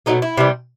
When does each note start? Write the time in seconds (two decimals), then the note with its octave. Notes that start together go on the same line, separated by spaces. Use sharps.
0.06 B2 F#3 A3 D#4
0.22 E4
0.37 C3 E3 G3